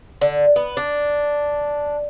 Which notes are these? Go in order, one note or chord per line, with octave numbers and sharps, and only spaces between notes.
D3
B3
D4